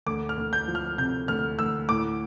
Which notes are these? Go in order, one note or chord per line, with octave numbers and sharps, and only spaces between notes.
D2 D6
F6
D2
G6
F3
F6
C3 G6
D2 F6
D2 E6
A2 D6